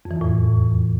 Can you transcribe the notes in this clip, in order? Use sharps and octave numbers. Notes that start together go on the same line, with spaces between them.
F2
E3
E2
A2